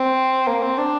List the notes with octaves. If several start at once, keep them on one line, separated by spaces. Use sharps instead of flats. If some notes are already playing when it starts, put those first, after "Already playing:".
Already playing: C4
A#3
C4
D4